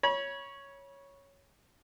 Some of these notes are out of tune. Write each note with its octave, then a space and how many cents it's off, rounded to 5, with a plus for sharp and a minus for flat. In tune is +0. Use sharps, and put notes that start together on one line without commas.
C#5 +0 B5 -35